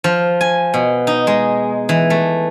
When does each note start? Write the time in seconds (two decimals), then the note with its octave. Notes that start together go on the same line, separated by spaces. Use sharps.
0.04 F3
0.41 G#5
0.74 B2
1.07 D#4
1.27 G#3
1.89 E3
2.10 A3